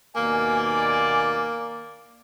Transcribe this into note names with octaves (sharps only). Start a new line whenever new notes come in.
D#2 B2 A#3 D5 G#5